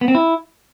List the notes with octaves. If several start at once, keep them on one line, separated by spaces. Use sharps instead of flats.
B3
C4
E4